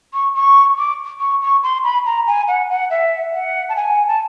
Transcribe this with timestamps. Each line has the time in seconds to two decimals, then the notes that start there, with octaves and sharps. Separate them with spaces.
0.14 C#6
0.35 C#6
0.78 D6
1.20 C#6
1.42 C#6
1.63 C6
1.84 B5
2.06 A#5
2.27 G#5
2.48 F#5
2.70 F#5
2.90 E5
3.34 F#5
3.69 A5
3.76 G#5
4.08 A5